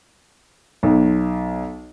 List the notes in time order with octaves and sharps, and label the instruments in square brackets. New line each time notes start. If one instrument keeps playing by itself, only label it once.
[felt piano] B1